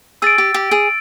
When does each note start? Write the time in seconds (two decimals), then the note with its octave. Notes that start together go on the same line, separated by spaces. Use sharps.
0.22 G#4 E6 A6 D7
0.38 G4
0.54 G4
0.71 G#4